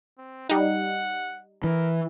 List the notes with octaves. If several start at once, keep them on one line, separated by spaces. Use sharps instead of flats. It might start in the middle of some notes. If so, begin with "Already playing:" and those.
C4
G3 D#4 F#5
E3 A#4